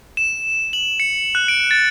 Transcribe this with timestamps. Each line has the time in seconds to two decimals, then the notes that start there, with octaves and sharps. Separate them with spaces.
0.17 E7
0.73 F#7
1.00 C#7
1.35 F#6
1.48 D7
1.71 A6